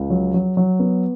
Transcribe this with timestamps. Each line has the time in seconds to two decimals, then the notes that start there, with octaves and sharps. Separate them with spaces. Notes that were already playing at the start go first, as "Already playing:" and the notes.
Already playing: C#2
0.10 F#3
0.34 F#3
0.57 F#3
0.79 B3